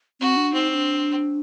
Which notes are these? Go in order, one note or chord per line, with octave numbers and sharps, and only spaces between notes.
C4 F#4
D4
C4 D#4
D#4
D4